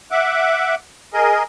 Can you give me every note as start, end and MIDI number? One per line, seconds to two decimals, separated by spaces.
0.11 0.75 76
0.11 0.75 78
0.11 0.75 86
1.14 1.43 68
1.14 1.43 70
1.14 1.43 75